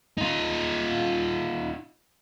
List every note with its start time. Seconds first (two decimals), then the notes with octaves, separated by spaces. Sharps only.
0.18 D#4 F4